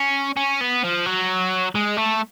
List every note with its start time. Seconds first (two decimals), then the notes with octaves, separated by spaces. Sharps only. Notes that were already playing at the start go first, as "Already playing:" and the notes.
Already playing: C#4
0.37 C#4
0.61 B3
0.83 F3
1.06 F#3
1.75 G#3
1.97 A3